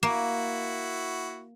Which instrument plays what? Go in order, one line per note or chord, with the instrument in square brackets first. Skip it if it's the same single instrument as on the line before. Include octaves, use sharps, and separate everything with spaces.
[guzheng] A#3 [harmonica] E4 F#4